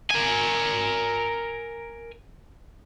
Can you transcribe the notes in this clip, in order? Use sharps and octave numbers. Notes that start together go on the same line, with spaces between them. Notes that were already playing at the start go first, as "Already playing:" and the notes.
A#4 G#5